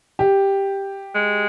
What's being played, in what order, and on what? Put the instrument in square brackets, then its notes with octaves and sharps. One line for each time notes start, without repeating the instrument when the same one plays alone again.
[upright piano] G4
[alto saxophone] G#3